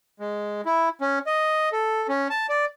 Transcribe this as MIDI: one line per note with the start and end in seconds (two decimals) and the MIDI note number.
0.20 0.61 56
0.66 0.89 64
1.01 1.19 61
1.27 1.69 75
1.72 2.07 69
2.09 2.28 61
2.30 2.47 81
2.49 2.65 74